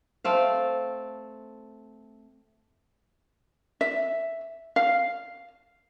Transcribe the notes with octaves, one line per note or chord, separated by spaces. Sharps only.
A3 C4 F5
E5
F5